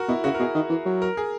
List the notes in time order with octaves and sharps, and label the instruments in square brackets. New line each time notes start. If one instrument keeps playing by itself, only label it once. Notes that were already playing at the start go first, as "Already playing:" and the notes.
Already playing: [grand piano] F#4 A#4
[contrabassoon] B2 [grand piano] E4
[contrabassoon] C#3 [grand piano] F#4
[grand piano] A#4
[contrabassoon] B2 [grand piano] G#4
[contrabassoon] D#3
E3
F#3
[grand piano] A#4
G#4